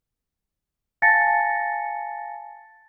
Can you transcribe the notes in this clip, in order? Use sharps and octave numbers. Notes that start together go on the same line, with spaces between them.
F5 G#5 A5 A6 A#6 C#7